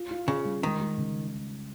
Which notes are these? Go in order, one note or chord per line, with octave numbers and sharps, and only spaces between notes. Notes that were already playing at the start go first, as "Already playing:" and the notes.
Already playing: F4
F4
C#3 F4
G3
D#3 G#3
G#3
C#3